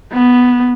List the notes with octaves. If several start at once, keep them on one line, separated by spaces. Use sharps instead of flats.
B3